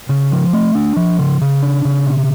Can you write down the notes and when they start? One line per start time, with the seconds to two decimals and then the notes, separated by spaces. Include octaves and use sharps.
0.09 C#3
0.32 F3
0.53 A3
0.75 D4
0.97 F3
1.19 C#3
1.41 C#3
1.63 D4
1.85 C#3
2.07 B2